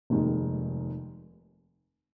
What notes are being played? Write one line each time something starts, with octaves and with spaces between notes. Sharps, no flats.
F1 D#2 D#3 G#3